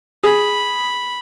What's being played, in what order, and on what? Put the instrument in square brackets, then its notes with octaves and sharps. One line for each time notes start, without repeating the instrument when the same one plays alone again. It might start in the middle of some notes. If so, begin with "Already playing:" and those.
[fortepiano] G#4 [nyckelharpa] B5